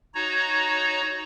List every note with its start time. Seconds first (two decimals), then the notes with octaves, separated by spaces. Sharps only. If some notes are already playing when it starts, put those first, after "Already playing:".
0.15 D#4 F#4 C#5 A#5